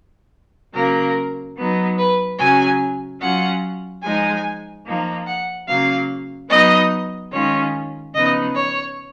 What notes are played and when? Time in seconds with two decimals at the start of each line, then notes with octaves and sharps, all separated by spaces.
0.74 C#3 F#3 A#3 A#4
1.57 F#3 B3 D#4
1.98 B4
2.39 C#3 F#3 C#4 G#5
3.21 F#3 C#4 F4 F#5
4.03 F3 G#3 D#4 G#5
4.86 F3 A#3 D#4
5.27 F#5
5.68 C#3 F#3 A#3 F5
6.49 F#3 B3 D#4 D#5
7.32 D#3 G#3 C#4 F4 C#5
8.14 C#3 F3 B3 D#4 D#5
8.56 C#5